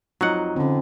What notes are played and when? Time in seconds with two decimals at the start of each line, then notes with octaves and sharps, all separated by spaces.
0.21 F2 F#3 D#4 F#5
0.56 D3 C4 C#4